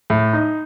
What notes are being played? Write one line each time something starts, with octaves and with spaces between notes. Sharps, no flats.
A2
D#4